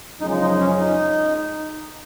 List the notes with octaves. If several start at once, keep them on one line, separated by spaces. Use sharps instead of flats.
F#2 C#3 F3 G#3 D#4
D#4
C#4
D#4